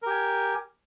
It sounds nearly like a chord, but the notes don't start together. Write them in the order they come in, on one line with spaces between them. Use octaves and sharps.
A#4 G4 G#5